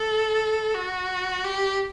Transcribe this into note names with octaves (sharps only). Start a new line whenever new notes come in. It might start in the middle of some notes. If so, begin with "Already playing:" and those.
Already playing: A4
F#4
G4